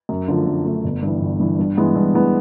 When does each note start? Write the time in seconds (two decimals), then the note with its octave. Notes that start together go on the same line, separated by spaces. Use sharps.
0.09 F#2
0.28 D3 F3 A3
0.47 F#2
0.65 D3 F3 A3
0.84 G1
1.03 G2 E3
1.21 G1
1.40 G2 E3
1.59 G2
1.77 E3 G#3 B3
1.95 G2
2.14 E3 G#3 B3